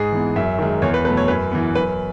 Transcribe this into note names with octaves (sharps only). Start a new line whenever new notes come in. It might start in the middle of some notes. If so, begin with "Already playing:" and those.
Already playing: G#2 G#4
E3 B3
F#2 E5
D#3 G#3
E2 C#5
B4
B2 F#3 A3 B4
C#5
F#2 B4
E3 B3
F#2 B4